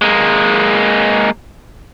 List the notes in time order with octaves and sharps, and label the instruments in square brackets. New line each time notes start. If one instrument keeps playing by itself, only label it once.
[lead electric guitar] G#3 A#3